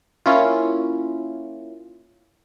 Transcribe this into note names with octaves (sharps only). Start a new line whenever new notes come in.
A#3 C#4 E4 F4